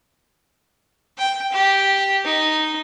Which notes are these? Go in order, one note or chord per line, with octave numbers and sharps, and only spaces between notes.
G5
G4
D#4